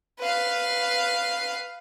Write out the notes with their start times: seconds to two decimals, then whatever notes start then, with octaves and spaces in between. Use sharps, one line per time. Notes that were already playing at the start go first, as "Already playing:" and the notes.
0.19 B4 F5